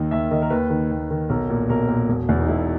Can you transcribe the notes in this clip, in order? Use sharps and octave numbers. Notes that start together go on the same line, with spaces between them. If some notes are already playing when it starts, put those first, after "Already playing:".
Already playing: D#2 D#3 D#5
D#2 E5
D#3 D#5
A#4
D#2 B4
D#3
D#2
D#3
B1 A#4
A#2
B1 A#4
A#2
E1
E2 B2
D#4
E1 E4